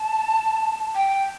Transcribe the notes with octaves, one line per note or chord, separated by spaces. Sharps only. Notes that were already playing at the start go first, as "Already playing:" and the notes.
Already playing: A5
G5